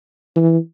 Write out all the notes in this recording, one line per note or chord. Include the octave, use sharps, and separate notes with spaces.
E3